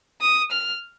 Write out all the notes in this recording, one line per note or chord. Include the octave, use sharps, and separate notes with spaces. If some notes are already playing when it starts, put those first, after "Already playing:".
D#6
F6